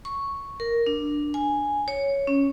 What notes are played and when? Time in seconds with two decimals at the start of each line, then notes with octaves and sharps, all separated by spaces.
0.05 C#6
0.60 A#4
0.86 D4
1.34 G#5
1.88 C#5
2.27 C#4